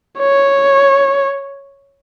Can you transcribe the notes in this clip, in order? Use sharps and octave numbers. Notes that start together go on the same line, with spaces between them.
C#5